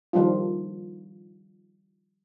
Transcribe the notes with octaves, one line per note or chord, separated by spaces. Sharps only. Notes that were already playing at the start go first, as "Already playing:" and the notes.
D#3 F3 G3 D4 F4